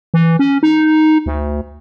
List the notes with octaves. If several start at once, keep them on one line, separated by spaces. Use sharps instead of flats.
E3
C#4
D#4
D2